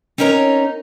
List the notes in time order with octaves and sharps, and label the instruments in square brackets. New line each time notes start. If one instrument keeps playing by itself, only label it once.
[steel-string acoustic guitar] C4 C#4 D#4 A#4 C#5 A#5